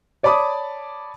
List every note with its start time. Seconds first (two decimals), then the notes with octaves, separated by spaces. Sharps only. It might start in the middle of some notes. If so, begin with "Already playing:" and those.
0.23 C#5 D5 A5 B5 D6 D#6